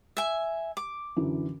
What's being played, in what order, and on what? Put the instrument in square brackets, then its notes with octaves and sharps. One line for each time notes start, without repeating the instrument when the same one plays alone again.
[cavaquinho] E5 G#5
D6
[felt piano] F#2 D3 E3